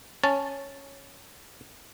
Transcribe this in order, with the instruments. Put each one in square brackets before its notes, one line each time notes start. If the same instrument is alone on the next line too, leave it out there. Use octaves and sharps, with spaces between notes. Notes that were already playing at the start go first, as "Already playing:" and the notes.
[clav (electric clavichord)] C#4 A5